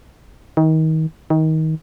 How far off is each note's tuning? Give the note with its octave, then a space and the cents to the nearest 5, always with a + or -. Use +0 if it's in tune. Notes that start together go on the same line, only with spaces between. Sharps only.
D#3 +30
D#3 +25